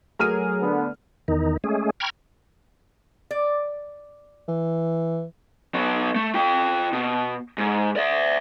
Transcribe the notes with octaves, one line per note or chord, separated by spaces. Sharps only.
F#3 A3 G#4 A#4 F6 D#7
D3 B3
E2 D#3 D#4
G#3 A3 C#4 G#4
G5 A#5 B5 C#6 F6 G#6
D5
E3
F#3 B3
A3
F4 G5
B2
G#2
D5 E5